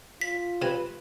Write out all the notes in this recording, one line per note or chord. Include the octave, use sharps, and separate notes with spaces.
F4 B6
C3 B4 G#5